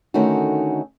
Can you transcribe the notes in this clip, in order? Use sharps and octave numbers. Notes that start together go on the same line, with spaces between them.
D3 D#3 A3 C#4 D#4 F#4